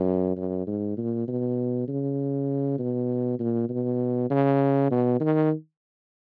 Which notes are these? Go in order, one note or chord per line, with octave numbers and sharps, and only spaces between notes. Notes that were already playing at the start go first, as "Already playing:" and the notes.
Already playing: F#2
F#2
G#2
A#2
B2
C#3
B2
A#2
B2
C#3
B2
D#3